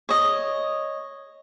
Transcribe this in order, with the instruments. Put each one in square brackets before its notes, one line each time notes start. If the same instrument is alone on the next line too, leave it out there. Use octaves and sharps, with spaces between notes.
[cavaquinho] C#5 D#5